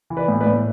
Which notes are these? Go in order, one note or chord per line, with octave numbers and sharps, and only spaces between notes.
E3
B4 D5
A2
B4 D5
A2